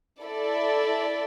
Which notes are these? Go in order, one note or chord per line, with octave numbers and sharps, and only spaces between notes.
E4 A4 D5